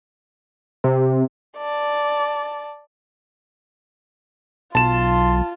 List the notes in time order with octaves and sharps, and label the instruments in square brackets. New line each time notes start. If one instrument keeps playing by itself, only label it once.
[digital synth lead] C3
[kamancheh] D5 A5
[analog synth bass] B1 [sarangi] F4 [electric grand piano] A5 E7 [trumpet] C6